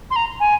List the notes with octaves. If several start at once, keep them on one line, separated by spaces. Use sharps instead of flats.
C6
A#5
G#5